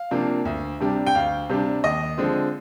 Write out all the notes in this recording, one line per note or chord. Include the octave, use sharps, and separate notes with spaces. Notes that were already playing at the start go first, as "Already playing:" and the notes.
Already playing: F5
C3 F3 A#3 D4
D2
C3 G3 D4
G5
D2 F5
C3 G3 D4
D#2 D#5
D3 F3 G#3 C4